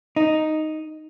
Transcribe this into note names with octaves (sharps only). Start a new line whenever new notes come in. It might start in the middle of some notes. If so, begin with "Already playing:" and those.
D#4